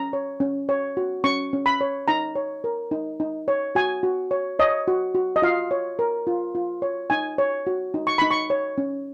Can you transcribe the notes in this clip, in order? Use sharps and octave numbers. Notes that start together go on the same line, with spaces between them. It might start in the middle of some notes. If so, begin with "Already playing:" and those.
Already playing: C#4 A#5
C#5
C#4
C#5
F#4
C#4 C#6
C#4
B5
C#5
D#4 A#5
C#5
A#4
D#4
D#4
C#5
F#4 G#5
F#4
C#5
C#5 D#5
F#4
F#4
D#5
F4 F5
C#5
A#4
F4
F4
C#5
D#4 G#5
C#5
F#4
D#4
C#6
D#4 B5
C#6
C#5
C#4